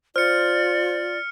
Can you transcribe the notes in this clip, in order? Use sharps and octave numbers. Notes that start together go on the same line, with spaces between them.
F4 C5 D5 F6 C#7